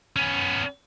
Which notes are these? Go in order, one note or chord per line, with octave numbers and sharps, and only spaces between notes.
B3 C#4